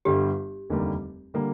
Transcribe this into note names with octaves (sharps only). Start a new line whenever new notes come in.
G1 G2 D3 G3 G4
F1 D#2 D3 G3 A#3
D3 G3 A#3